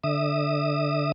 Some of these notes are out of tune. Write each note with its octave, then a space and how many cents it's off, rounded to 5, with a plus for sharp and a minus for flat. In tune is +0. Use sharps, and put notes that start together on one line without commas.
D3 +0 E5 -15 D#6 -30